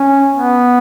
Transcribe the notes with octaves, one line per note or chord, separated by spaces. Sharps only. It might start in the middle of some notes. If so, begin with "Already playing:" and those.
Already playing: C#4
B3